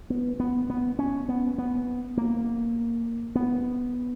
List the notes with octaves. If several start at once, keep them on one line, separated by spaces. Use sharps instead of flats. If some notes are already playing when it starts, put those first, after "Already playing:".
B3
B3
B3
C#4
B3
B3
A#3
B3